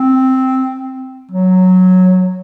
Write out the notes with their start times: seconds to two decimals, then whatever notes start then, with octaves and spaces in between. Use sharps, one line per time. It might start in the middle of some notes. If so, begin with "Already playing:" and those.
Already playing: C4
1.31 F#3